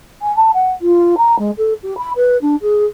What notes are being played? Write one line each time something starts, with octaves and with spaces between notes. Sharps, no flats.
G#5
A5
F#5
F4
A#5
G#3
A4
G4
B5
B4
D4
G#4